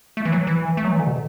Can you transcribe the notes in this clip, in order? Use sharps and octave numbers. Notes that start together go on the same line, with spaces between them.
A3
E3
F#3
E3
A3
F#3
E3
D3
B2